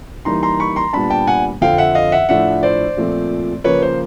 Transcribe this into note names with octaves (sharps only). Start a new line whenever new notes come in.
E3 G3 A#3 D#4 A#5 C6
A#5 C6
B5 C#6
A#5 C6
A#2 G3 B3 D4 A5 B5
G5 A5
F#5 G#5
F2 D3 F3 F5 G5
E5 F#5
D#5 F5
E5 F#5
A2 F3 A3 D4 E5 F#5
C5 D5
A#2 F3 A3 C4
C#3 F3 A#3 B4 C#5
C5